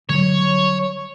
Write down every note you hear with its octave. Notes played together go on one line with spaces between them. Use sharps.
D3 F#3 G3 C#5